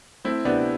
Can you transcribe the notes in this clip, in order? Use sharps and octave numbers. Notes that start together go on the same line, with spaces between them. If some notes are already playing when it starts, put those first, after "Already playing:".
A3 C4 E4
C3 B3 D4